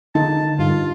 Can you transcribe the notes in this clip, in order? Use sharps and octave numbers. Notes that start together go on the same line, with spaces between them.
D3 D#4 A5
G2 F4